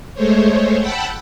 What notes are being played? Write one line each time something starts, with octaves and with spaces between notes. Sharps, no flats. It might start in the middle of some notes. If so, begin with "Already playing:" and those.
G#3 A3 C5 C#5
F#5 G5 A5 B5 E6 F#6